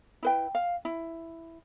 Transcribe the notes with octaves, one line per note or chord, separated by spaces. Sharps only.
E4 B4 G5
F5
E4